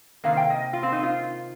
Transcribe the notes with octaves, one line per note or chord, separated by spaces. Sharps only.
C3 D#3 A#3 F5
G5
D#5
F4
C4
D#4
F4